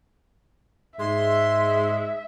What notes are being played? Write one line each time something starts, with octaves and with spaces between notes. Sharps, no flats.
G#2 G#3 E5 C6